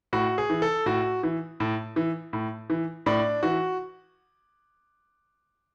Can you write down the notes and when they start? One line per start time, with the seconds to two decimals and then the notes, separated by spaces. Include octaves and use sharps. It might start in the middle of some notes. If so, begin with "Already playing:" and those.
0.13 A2 F#4
0.38 G#4
0.50 E3
0.62 A4
0.86 A2 F#4
1.23 E3
1.60 A2
1.96 E3
2.33 A2
2.70 E3
3.06 A2 D4
3.43 E3 F#4